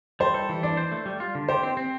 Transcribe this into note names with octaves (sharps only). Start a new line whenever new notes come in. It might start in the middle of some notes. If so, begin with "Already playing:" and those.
G3 C5
A4
E3
D4 D5
C5
A3
G3
F4
D3
G4 C5
C4
C4